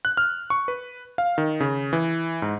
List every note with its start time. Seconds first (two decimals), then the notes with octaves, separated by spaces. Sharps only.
0.05 F#6
0.17 F6
0.50 C#6
0.68 B4
1.18 F5
1.38 D#3
1.60 C#3
1.93 E3
2.42 G#2